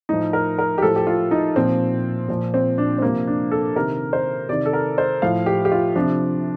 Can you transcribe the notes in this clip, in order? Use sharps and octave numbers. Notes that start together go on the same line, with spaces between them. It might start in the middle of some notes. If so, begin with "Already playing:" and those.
A2 F3 D#4
A#4
A#4
G4
A2 F3 A4
G4
F4
D#4
A#2 F3 C4
A#2 F3
C4
D4
C4
C3 F3 A#3
D4
A4
C3 D#3 A#4
C5
C3 D#3 D5
A4
A#4
C5
A2 F3 F5
G4
G4
F4
C3 F3 D4